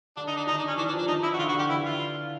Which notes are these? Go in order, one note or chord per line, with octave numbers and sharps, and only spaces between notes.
D3 D4
D#4
D4
D#3 D#4
D4
C#4
E3 D4
D4
F3
D4
D#3 D#4
E4
F#4
D3 F4
F#4
D3
G4
E3 E4
F4